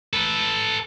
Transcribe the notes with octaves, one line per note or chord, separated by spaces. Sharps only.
A4 B4